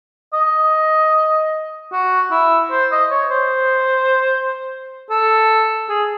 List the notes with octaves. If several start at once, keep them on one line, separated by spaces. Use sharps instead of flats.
D#5
F#4
E4
C5
D#5
C#5
C5
A4
G#4